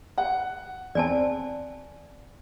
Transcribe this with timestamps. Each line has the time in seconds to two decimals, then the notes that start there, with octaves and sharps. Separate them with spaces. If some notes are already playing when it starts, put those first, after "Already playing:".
0.18 F#5
0.95 E2 C4 D5 G#5 A5